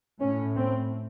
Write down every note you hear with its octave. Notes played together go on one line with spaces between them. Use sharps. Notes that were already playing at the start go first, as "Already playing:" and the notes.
A2 C#4
C4